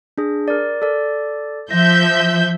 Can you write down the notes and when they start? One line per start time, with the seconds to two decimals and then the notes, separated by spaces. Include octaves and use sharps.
0.18 D4 G#4
0.48 A#4 D5
0.82 A4 D5
1.71 F3 E5 G6 A#6